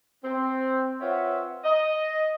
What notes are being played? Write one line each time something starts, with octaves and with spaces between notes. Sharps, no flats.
C4
C4 F4 B4 C#5 E5 F#5
D#5